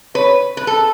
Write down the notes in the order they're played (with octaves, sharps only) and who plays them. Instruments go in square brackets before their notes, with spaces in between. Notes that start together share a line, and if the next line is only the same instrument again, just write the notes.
[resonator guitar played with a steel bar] B4 [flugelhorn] C#5
[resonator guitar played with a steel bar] B4
A4